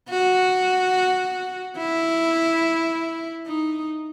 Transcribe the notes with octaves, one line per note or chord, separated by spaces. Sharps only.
F#4
E4
D#4